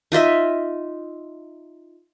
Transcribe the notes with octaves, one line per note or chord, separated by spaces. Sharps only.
D#4 F4 D#5 E5